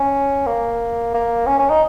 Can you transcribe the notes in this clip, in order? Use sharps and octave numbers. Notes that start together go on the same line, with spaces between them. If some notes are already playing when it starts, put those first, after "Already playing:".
Already playing: C#4
A#3
A#3
C#4
C#4
D#4